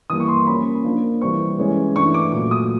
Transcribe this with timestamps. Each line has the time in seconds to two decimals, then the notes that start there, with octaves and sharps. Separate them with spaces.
0.10 E3 G3 A#3 D#6
0.20 C#6
0.28 C6
0.47 F3 A#3 C#4 B5
0.84 F3 A#3 D4
1.21 E3 G3 C4 C#6
1.59 E3 G#3 C#4
1.96 E3 A3 D4 C#6
2.14 D6
2.32 A#2 F#3 A3 D6
2.51 D#6